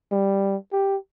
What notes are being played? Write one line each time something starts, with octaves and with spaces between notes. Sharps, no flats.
G3
G4